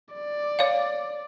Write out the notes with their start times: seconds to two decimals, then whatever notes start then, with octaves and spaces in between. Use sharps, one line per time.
0.14 D5
0.59 C#5 F5